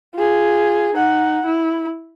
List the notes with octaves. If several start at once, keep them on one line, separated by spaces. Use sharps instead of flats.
F4 G#4
D#4 F#5
E4